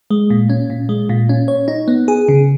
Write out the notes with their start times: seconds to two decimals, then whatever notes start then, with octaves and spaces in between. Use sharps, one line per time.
0.10 G#3
0.30 A#2
0.50 C#4
0.70 A#2
0.89 G#3
1.09 A#2
1.29 C#4
1.48 C#5
1.68 D#4
1.88 B3
2.08 G#4
2.28 C#3